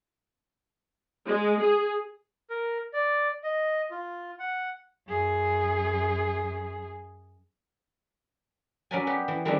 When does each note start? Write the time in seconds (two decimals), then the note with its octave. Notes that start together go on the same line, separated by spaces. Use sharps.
1.27 G#3
1.61 G#4
2.50 A#4
2.94 D5
3.44 D#5
3.91 F4
4.39 F#5
5.08 F#2 G#4
8.91 F#3 C#4 A#4 B4 D5 G#5
9.07 B3 F#4 G4
9.28 E3
9.45 D#3 E3 G3 G#3 C4 D4